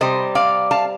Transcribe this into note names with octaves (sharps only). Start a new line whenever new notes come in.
C3 G3 C5 D#5
D5 F5
F5 A5